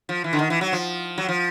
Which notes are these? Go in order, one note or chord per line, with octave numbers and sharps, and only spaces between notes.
F3
E3
D3
D#3
E3
F#3
F3
F#3
F3